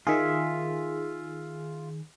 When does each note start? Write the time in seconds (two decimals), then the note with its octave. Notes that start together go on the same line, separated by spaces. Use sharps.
0.07 D#3 F4 G#4 E5